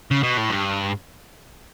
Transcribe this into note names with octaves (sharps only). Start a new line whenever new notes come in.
C#3
B2
A2
G2